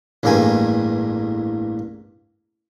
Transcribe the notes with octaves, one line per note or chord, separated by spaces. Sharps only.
A1 E2 G2 A#3 G5 G#5